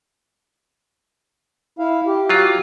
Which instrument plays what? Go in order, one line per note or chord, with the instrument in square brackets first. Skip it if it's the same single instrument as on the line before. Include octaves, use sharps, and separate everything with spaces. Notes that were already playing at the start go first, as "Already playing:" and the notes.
[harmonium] E4 F5
G4
[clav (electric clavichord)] F#3 F4